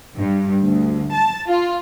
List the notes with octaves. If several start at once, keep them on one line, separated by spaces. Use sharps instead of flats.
G2
D2
A5
F4